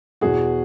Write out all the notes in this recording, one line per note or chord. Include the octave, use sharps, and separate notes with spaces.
E2 B2 F#4 G#4